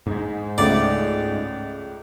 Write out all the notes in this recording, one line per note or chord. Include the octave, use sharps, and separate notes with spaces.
G#2 G#3
C#2 A3 D5